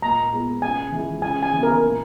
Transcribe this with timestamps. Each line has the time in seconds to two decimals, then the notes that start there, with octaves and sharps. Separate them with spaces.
0.02 A#2 A#5
0.32 G#3 B3
0.62 C#3 G#5
0.92 E3 G#3
1.22 C#3 G#5
1.43 G#5
1.53 E3 B3
1.63 A#4
1.83 A#2